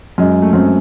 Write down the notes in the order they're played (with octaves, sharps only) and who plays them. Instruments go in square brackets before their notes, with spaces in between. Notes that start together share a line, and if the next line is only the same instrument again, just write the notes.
[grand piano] F#2 [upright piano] G#3
[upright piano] A3
[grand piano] F#2 [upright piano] C4